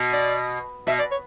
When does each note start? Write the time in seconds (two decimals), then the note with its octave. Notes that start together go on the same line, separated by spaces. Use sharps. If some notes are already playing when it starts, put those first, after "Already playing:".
Already playing: B2
0.13 D5
0.87 B2 E5
0.99 D5
1.11 C#5